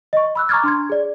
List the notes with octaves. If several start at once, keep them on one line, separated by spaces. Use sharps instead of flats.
D#5 C#6
B5 E6 F#6
A#5 C#6 D6 F6 G#6 A6
D4 C6 G#6
G#4 D5